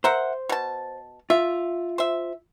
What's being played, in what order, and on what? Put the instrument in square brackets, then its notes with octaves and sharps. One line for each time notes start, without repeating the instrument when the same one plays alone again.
[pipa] A#4 E5 F#5 [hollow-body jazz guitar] C5
[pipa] B2 A5
[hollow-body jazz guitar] F4 [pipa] E5
[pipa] C5 E5